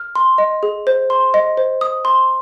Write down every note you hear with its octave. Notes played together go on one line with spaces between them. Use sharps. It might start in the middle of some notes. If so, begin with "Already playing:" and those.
Already playing: F6
C6
D#5
G#4
C5
C6
D#5
C5
D#6
C6